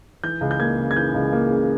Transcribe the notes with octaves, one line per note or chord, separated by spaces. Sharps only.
E3 G6
C#2
G6
A#3 G#6
C#3
G#6
E3 G6
C#2
A#3
C#3